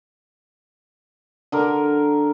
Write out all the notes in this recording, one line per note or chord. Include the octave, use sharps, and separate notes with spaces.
D3 A#4